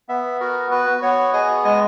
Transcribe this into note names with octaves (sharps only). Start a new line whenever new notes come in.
B3 E5
F#4 A#4
F#4 B4
B3 C#5
G#4 D#5
G#3 D#5